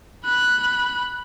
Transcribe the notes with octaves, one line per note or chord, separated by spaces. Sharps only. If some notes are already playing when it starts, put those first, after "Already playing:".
B5 F#6